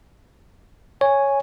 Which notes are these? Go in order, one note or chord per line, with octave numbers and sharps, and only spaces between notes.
C#5 G#5